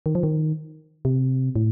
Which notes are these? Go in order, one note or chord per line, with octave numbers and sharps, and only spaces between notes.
D#3
F3
D#3
C3
A2